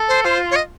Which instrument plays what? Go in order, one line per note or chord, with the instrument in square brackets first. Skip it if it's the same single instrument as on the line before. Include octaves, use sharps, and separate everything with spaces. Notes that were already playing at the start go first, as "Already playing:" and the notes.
Already playing: [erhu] A4
[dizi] C5
[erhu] F4 [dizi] C5
[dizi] C#5
D#5